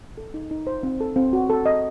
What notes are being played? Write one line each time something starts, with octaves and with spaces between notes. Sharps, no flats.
A4
D#4
D#4
C5
C4
A4
C4
F#4
A4
D#5